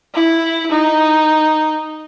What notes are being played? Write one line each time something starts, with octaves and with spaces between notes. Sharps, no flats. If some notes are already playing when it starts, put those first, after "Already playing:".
E4
D#4